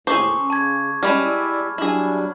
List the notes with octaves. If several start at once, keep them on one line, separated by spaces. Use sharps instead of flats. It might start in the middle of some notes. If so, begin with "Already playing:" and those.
D#2 A2 G#4 A4 C5 C#6 D6
C#3
A5 G#6
G3 G#3 C#4 A5 B5 F6
E4 D5 E5
F#3 G3 D4 E4 G#4